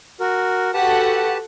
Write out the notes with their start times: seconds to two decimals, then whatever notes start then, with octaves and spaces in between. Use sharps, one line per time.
0.20 F#4 A#4
0.74 F#4 G4 A4 B4 F#5 A5